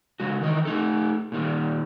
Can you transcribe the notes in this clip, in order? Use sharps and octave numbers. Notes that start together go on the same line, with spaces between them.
C#3 G#3 F#4
D#3 E3 D#5
A3 D#4 A4
A#2 D#3 G3